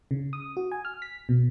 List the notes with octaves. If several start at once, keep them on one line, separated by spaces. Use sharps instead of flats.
C#3
D#6
F#4
G#5
F6
B6
B2